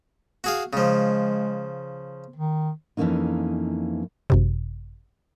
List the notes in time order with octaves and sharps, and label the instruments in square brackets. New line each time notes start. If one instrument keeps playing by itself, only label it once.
[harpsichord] F#4 G#4 F5
[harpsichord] C#3 F3 [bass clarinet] G#3
[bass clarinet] D#3
[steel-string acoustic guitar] F2 E3 G#3 A#3 C#4 D#4
[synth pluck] G#1 F#2 C3